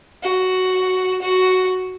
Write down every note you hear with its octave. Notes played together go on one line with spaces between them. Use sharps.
F#4
F#4